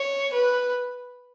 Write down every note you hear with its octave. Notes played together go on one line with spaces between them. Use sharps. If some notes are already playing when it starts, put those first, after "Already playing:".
Already playing: C#5
B4